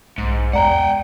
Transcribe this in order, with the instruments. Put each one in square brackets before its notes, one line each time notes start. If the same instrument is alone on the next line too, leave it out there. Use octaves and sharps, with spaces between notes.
[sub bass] B1 [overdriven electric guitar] G#2
[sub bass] E2 [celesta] D5 A#5 [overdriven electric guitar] F#5 G5